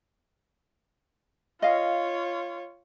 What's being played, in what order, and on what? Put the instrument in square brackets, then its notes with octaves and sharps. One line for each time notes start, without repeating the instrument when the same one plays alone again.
[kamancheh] F4 C#5 [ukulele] D#5 F5